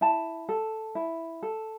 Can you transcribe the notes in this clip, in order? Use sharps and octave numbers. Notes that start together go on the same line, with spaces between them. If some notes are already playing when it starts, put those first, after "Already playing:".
E4 A5
A4
E4
A4